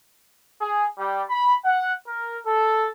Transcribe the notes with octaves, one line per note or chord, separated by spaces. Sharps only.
G#4
G3
B5
F#5
A#4
A4